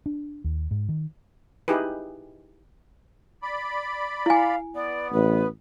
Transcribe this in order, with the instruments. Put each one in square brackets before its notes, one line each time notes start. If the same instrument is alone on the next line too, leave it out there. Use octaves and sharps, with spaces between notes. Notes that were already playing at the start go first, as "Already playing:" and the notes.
[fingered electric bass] D4
D#2
G#2
D#3
[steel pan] D#4 E4 G4 G#4 B4
[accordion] D5 B5
[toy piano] E4 G#5 [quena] F5
[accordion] B3 [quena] D5
[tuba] A1 [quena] B4